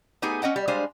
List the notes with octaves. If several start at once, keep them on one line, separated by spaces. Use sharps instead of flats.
A3 B3 D#4 G4 G#4 G#5
C#4 D#5 F#5 G5
G3
G3 G#3 D4 C5 F5 G#5